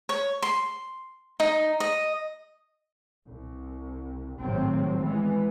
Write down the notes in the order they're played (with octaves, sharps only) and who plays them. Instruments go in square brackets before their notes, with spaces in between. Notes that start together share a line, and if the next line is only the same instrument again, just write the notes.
[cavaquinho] C#5
C6
D#4
D#5
[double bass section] C2
G#1 A2 C3 F#3 C4
E3 G#3 B3